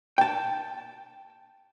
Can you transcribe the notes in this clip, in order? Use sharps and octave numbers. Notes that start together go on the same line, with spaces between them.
G5 A5